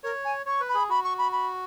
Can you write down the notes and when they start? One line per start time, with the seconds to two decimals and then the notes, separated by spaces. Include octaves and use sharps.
0.03 A#4 C#5
0.25 G#5
0.46 C#5 C#6
0.60 B4
0.68 B5
0.75 G#4
0.89 F#4 B5
1.03 C#6
1.18 B5
1.32 B5